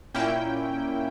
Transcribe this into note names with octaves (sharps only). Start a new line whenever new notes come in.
A#2 A#3 C#4 E4 G5